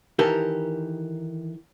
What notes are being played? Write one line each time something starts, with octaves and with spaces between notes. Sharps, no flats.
D#3 E3 G4 A4 A#4